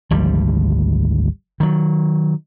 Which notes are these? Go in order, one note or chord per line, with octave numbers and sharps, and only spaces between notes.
G#1 D2 F3 G3
D#3 F#3